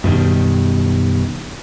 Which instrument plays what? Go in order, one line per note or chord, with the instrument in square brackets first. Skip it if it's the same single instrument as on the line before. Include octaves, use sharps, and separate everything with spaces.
[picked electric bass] F#2 B2 D#3 G3